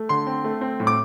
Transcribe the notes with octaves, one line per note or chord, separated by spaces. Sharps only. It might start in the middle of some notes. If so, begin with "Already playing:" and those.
Already playing: A3
D3 C6
C4
A3
C4
A2
D6